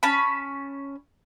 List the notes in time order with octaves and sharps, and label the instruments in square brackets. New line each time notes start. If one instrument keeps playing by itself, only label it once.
[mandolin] C#4 A5 B5